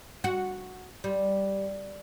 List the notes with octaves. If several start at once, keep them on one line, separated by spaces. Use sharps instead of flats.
F#4
G3